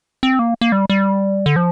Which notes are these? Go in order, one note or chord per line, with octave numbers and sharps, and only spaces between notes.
C4
A#3
A#3
G3
G3
D3
F3